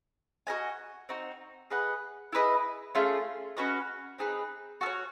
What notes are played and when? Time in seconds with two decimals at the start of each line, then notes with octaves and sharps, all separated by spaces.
0.47 F#4 A#4 D#5 G#5
1.09 C4 D#4 F#4
1.70 G#4 B4 D#5 F#5
2.33 E4 G#4 B4 D#5
2.95 A3 C#4 F4 G#4
3.57 C#4 F#4 B4 D#5
4.18 C4 D#4 G#4 B4
4.81 F#4 A4
4.86 C#5